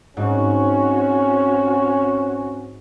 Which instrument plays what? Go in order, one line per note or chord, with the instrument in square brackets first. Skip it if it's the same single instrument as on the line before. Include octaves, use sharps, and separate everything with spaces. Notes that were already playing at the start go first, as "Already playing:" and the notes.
[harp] G#2 [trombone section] C4 C#4 [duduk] F#4